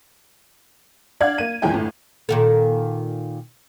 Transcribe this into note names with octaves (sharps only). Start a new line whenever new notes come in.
D4 D5 F5 F#5 G#6
A#3 D#7
G1 E2 A#2 G#3 G5 G#5
G1 A2
A#2 D#3 A4